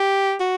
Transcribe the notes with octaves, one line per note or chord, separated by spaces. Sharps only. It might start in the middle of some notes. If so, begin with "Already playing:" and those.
Already playing: G4
F#4